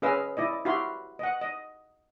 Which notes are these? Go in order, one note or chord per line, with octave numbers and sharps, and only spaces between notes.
C#4 G#4 B4 D#5 F5 E6
E4 D5 D#5
E4 F#4 G4 F5 B5 C6
D#5 F#5
D#5